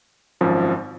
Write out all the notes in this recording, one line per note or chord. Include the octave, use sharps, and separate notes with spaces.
G#1 F#2 F3